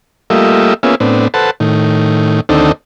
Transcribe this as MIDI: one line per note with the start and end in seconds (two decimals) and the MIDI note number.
0.30 0.74 55
0.30 0.74 57
0.30 0.74 58
0.30 0.74 65
0.30 0.74 75
0.30 0.74 76
0.83 0.95 58
0.83 0.95 59
0.83 0.95 61
0.83 0.95 65
0.83 0.95 68
0.83 0.95 76
1.00 1.28 45
1.00 1.28 59
1.00 1.28 60
1.00 1.28 62
1.34 1.51 69
1.34 1.51 71
1.34 1.51 72
1.34 1.51 78
1.34 1.51 81
1.60 2.40 45
1.60 2.40 51
2.49 2.72 38
2.49 2.72 51
2.49 2.72 60
2.49 2.72 62
2.49 2.72 63
2.49 2.72 69